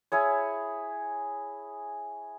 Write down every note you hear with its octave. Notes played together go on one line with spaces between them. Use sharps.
E4 G#4 C#5